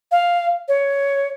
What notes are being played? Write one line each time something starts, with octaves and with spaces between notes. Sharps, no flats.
F5
C#5